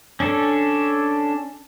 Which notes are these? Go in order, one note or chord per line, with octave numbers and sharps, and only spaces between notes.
C#4 D4 A4